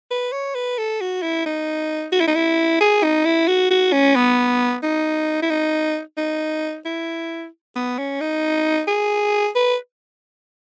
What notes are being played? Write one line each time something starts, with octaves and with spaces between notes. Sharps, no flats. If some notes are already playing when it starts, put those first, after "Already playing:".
B4
C#5
B4
A4
F#4
E4
D#4
F#4
E4
D#4
E4
G#4
D#4
E4
F#4
F#4
C#4
B3
D#4
E4
D#4
D#4
E4
B3
C#4
D#4
G#4
B4